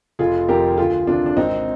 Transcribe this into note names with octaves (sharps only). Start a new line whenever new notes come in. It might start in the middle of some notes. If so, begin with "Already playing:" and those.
F1 F4 G#4
F2 D#3 G4 A#4
D2 F4 G#4
C3 D#3 D4 F4
D4
G#1 C4 D#4